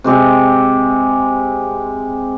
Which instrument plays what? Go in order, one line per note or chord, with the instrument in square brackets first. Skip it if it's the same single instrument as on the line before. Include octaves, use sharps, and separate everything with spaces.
[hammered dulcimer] C3 G#3 G4